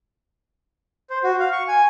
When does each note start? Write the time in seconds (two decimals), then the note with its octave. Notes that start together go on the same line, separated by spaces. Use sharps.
1.10 C5
1.24 F#4
1.40 F5
1.52 C#6
1.68 G#5